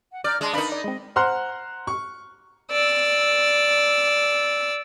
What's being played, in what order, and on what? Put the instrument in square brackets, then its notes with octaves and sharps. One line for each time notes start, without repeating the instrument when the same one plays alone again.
[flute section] F#5
[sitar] D5 [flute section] A#5 F6 G6
[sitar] G#3 [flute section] D4 D#5 C6
[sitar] D4 D#4 [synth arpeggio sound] A#4 B4 F5 [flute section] B5
[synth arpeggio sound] D5 G#6 [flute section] D#5
[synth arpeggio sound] G#3 C4
[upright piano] C5 F#5 A#5 C6 F6 F#6
C#6
[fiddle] D5 E6